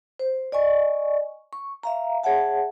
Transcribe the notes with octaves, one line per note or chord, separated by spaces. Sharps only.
C5
D5 D#5 G#5 C#6
C#6
E5 F5 A#5
G#4 C#5 E5 F#5 A5